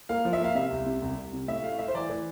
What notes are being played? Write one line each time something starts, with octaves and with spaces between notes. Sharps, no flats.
A#3 F5
F3
E5
A#3 F5
C3 E5
C2
C3
C2
C2
C3
A2 E5
A3 F5
A2 E5
C5
E3 D5
E3